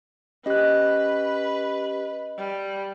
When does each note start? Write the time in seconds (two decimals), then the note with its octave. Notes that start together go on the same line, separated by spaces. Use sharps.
0.46 C#4 G4 B4 D#5 F#6
2.37 G3